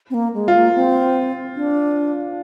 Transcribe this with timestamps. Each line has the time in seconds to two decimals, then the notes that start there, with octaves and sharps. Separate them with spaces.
0.10 C4
0.14 A#3
0.34 G#3
0.48 F4
0.54 A#3
0.75 C4
1.56 D4